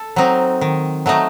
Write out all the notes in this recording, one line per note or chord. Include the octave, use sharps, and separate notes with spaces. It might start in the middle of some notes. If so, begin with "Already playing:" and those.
Already playing: A4
F#3 C4 D#4
D#3
F#3 A3 D#4